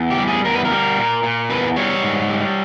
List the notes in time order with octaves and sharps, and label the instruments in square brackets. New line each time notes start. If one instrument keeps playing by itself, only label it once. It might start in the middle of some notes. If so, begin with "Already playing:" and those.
Already playing: [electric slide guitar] E2
G4
G3
G#4
E2 A#4
B4
A#4
G3
A#2
A#2
E2 B4
G3 C#5
G#2
G3